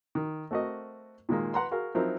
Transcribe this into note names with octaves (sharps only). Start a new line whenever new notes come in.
D#3
A3 C4 F#4 A#4 D#5
A#2 D#3 G#3 A#3
B4 F#5 A#5 C6
F#4 G#4 A#4 F5
F3 F#3 C4 D#4 E4 A#4